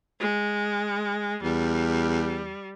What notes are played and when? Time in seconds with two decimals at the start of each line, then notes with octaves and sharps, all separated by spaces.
0.20 G#3
1.43 E2 G3